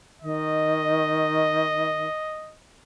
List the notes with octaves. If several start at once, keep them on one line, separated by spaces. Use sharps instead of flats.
D#3 D#5